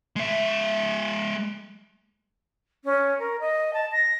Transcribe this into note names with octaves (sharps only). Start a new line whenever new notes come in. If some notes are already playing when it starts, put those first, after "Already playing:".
G#3 E5
C#4
A#4
D#5
A5
A#6